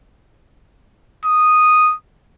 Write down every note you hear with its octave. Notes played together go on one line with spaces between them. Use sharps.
D#6